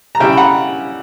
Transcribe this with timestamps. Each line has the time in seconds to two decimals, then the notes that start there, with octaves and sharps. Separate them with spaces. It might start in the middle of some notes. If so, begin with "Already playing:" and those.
0.15 A#5
0.20 C#3 G3 C#4 E4 E5 G5
0.32 B5
0.37 F#5 A#5